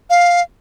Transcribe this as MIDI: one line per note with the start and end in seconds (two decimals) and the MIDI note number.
0.10 0.42 77